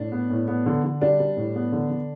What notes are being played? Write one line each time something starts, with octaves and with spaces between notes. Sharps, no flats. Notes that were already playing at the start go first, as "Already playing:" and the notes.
Already playing: A2 D4
B3
A2
B3
D3
D3
G3 D4
G3
A2
B3
D3
D3